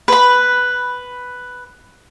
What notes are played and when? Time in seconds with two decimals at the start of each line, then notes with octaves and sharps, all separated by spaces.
0.08 B4 B5